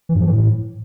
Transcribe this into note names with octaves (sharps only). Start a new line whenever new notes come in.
E3
G2
F3
E3
A2